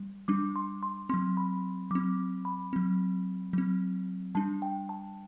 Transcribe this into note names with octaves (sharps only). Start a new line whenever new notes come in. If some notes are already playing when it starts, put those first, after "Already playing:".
Already playing: G3
G3 D4 D6
C6
C6
F#3 C4 C6
B5
F#3 C4 D6
B5
F#3 C4
F#3 C4
G3 D4 A5
G5
A5